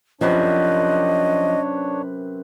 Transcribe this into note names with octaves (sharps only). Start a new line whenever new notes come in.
F#2 C3 F3 D4 B4 C#5 D#5